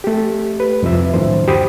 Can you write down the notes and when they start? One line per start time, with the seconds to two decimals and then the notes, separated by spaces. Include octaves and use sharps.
0.04 A3 G4
0.60 B4
0.82 C2 F2 F4 E5
1.14 F#2 A2 D#3 F3 C5
1.47 D2 F#4 G4 C5 B5 D#6